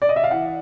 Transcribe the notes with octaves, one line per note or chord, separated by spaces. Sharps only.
D5
D#5
E5
F5
E3 F#5